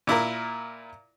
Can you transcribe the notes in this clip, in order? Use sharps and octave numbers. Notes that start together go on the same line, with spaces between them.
A#2 E4 F4 A#4